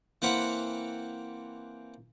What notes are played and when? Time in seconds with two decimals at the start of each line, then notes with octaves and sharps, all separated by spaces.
0.22 E3 A#3 C4 F#5 B5